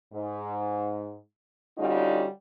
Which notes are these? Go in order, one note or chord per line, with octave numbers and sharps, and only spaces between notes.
G#2
D3 G3 C#4 D#4 F4 F#4